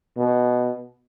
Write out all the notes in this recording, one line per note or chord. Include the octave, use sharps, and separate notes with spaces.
B2